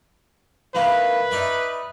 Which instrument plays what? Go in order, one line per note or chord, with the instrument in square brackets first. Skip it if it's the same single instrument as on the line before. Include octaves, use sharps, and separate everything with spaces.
[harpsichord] D#3 A#3 E4 [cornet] B4
[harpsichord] D#4 D5 E5